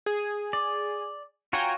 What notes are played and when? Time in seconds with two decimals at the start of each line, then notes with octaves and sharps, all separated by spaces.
0.06 G#4
0.53 D5
1.53 F4 F#4 C#5 G5 G#5 A#5